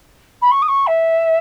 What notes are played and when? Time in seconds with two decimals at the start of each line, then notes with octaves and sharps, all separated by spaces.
0.41 B5
0.51 C#6
0.62 D#6
0.68 C#6
0.86 E5